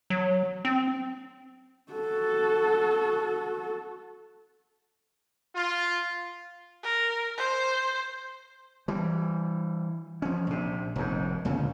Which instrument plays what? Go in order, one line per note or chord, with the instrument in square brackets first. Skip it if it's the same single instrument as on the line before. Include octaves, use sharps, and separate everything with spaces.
[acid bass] F#3
C4
[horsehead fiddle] F#4 A4
[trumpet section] F4
[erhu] A#4
C5
[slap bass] E3 G3
F3 C#4
A#1 C3
F1 D#2 G#2
C#2 A#2 D3 C#4